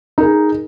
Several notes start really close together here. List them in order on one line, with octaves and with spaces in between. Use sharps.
D#4 A#4 G#4